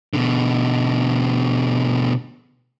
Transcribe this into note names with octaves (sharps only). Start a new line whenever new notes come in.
B2 D3